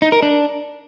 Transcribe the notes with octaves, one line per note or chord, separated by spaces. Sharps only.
D#4
A#4
D4